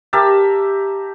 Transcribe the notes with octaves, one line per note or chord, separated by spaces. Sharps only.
G4 A#4 E5 A5